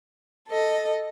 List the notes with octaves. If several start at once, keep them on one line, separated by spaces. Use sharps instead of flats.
A4 D#5